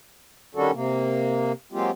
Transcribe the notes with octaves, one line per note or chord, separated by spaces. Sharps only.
D#3 G3 C#4 D4 F#4 A4
C3 A#3
F#3 G#3 A#3 C4 F4 G4